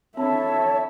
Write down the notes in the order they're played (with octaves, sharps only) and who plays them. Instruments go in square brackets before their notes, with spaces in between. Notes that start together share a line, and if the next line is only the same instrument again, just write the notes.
[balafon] C4 D4 [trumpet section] E4 A4 A5 [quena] C#5 [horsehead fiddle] E5